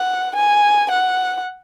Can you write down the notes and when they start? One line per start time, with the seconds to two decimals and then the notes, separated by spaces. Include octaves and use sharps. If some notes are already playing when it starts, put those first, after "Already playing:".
Already playing: F#5
0.35 G#5
0.91 F#5